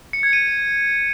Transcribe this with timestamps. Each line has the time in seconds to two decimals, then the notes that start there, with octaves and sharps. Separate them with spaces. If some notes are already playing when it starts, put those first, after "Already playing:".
0.13 C#7
0.23 G#6
0.33 D#7